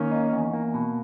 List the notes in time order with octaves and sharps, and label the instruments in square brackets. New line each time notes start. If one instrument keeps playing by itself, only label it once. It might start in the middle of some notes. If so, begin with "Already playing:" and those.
Already playing: [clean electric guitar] D#3 [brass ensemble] A#3 C#4
[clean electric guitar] D#4
E2
A#3
B2